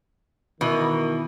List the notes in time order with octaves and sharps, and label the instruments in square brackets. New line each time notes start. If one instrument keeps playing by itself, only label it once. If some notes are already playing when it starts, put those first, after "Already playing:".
[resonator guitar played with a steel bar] B2 E3 [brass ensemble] D#3